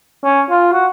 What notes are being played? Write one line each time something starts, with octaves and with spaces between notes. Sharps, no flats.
C#4
F4
F#4